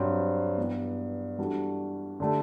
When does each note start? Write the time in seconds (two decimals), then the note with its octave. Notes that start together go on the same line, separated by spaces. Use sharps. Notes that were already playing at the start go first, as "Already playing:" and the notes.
Already playing: G2 F#3 C4 F#4 C5
0.58 G2 E3 B3
1.38 E3 G3 D4 F#4 A4
2.20 D3 A3 D4 G4